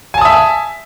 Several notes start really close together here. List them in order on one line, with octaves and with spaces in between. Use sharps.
G#5 A5 D#6 E5